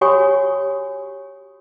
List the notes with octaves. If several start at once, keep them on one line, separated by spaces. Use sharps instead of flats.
F#4 G4 C#5 G#5 C#6 D#6